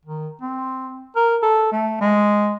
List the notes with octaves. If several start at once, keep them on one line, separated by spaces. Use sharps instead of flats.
D#3
C4
A#4
A4
A3
G#3